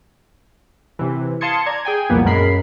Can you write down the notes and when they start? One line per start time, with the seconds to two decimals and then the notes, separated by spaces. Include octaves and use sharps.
0.99 C3 E3
1.41 F5 A5 C6 D#6 G#6 C#7
1.66 D5 A#5 G#6
1.85 G#4 G5 G#5
2.10 C2 F2 A#2 A#3 B3
2.25 F#2 G#3 A#4 B5 C7